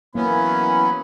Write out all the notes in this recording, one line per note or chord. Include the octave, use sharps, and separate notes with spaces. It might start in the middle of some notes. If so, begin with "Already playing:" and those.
E3 F#3 A#3 B3 C#4 B5